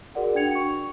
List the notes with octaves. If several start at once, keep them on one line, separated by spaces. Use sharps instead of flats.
F#4 G#4 A#4 D5 F#5
D4 F#4 G5 G#6 C#7 F7
C#6